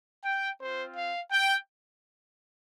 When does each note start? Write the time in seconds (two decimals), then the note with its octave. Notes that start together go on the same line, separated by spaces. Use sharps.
0.24 G5
0.60 C4 F4 C5
0.96 F5
1.31 G5